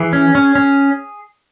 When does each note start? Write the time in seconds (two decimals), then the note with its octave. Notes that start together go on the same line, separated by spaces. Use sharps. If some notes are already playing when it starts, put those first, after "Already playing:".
Already playing: E3 G#4
0.13 C#4
0.35 C#4
0.55 C#4